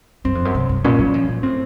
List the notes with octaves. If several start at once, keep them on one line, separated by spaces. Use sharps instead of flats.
F#2 C4
F2
F#2
C3
F#2
A#2 C#4
F#3
F3
A#2
A2 C4